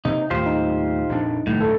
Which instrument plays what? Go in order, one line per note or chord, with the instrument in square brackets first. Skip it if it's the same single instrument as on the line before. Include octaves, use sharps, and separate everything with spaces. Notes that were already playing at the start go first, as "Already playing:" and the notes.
[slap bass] C3 A#3 [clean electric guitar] D#4
[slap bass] D#2 A2 [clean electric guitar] F4 G4 C5
[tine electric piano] D#4
[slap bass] A#1 F2 D4
[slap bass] F2 D#3 G3 [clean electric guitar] A2
[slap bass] F1 D2 G2 [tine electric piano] A4